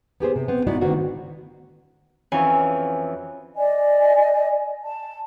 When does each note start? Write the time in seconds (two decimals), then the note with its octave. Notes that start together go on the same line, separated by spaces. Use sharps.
0.20 B3 G4 G#4 C5
0.36 C3
0.48 B3 C4
0.67 G#3 B3 D#4 E4 F#4 D5
0.81 D3 D#3 A3 B3 C4 F#4
2.32 F2 E3 C#4 F#4 C#5 G#5
3.55 D5 D#5 G#5
4.83 A5